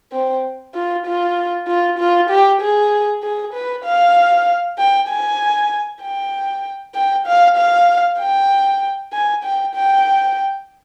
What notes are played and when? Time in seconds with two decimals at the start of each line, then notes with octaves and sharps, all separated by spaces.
0.12 C4
0.74 F4
1.06 F4
1.68 F4
1.98 F4
2.30 G4
2.61 G#4
3.23 G#4
3.54 B4
3.85 F5
4.78 G5
5.09 G#5
6.02 G5
6.95 G5
7.26 F5
7.57 F5
8.20 G5
9.13 G#5
9.44 G5
9.74 G5